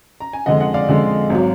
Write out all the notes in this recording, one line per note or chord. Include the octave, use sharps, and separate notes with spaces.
A#5
G#5
F2 D3 G#3 D#5 F#5
D#5 F#5
D5 F5
F2 D3 G#3
G#1 F#3